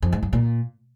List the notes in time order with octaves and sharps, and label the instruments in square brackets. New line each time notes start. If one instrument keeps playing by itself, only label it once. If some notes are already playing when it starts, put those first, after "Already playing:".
[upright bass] F2
G#2
G2
A#2